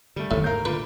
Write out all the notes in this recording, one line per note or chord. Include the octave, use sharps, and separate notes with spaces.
D3 G3 A3
F#1 D#2 A2
G#2 A#4 F5 G6
A#2 D3 B4